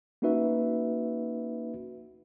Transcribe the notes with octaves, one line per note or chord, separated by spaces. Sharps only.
A#3 C#4 D#4 F#4 B4 E5